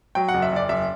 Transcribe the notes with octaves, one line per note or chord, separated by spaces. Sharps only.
F#3 G5
F#5
F#1
E5
F#1 D5
F#1 E5